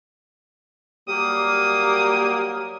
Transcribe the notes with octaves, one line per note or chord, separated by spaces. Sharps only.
F#3 G3 A#3 G4 D#6